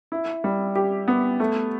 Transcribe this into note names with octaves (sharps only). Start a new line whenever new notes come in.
E4
G3
G4
B3
A3